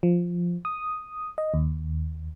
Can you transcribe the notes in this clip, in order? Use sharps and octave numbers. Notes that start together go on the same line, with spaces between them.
F3
D#6
D#5
D#2